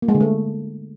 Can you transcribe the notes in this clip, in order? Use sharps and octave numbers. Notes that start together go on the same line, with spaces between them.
A#3
G#3
D3
A3